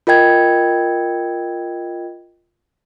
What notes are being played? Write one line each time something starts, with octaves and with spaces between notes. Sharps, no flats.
F4 A#4 D#5 G5 G#6